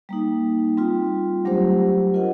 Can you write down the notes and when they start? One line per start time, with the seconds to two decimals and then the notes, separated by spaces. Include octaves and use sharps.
0.09 G3 A#3 D#4
0.77 G3 C4 F4
1.45 F#3 A3 D4 G4 C5
2.14 F4 A#4 D#5 F#5